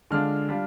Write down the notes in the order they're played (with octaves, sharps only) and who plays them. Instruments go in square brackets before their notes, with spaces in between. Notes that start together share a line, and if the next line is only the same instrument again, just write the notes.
[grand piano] D3 G#3 D4 F4 F6
G3 D4 F4